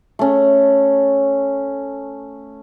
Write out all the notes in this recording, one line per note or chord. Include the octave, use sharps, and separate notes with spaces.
A3 C#4